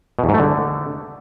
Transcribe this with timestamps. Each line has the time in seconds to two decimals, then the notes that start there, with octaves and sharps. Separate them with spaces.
0.19 B2
0.24 E2
0.29 G#2
0.34 A3
0.39 D3